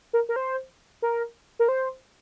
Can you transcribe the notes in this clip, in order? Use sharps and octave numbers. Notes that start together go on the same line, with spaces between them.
A#4
A#4
C5
A#4
A#4
C5